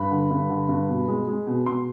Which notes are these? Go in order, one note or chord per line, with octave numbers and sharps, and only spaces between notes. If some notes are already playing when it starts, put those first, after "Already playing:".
Already playing: G2 B5
D3
G2
D3
G2
B2
G#3
G#3
B2
B2 C6